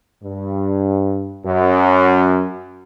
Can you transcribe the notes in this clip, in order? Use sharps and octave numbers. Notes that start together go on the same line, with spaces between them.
G2
F#2